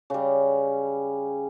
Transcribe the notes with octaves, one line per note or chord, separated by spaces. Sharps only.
C#3 G3